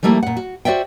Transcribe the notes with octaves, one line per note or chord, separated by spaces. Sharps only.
F3 G3 A3 A#3 E4
A#2 F#5
F#4
F#4 C5 D5 E5 G5